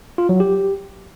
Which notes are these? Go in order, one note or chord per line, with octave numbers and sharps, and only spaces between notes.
F4
F#3
G4